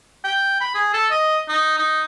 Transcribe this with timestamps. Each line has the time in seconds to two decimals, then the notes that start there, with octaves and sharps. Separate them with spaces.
0.24 G5
0.60 B5
0.74 G#4
0.93 A4
1.10 D#5
1.48 D#4
1.78 D#4